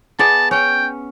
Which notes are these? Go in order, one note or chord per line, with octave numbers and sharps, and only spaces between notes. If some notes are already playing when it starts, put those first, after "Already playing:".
B3 G#4 D5 A5
C#4 G5